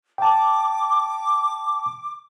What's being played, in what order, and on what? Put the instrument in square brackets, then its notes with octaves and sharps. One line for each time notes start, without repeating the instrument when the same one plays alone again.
[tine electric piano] G5 A5 [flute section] D6